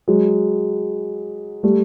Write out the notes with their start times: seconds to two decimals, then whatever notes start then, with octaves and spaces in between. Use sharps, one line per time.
0.08 F#3 G#3
1.63 G3 A3